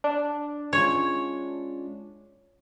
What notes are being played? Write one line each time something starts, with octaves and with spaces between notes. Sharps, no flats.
D4
G#3 C#4 F4 C#5